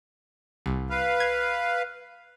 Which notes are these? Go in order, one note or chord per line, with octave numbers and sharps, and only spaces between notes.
C2
B4 F5
G#6